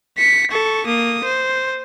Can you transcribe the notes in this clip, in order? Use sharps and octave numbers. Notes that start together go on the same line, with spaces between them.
B6 C#7
A4 C#6
A#3 D#6
C5